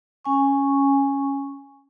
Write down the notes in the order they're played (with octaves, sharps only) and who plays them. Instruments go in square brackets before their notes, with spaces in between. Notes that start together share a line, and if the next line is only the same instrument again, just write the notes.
[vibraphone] C#4 G#5 C#6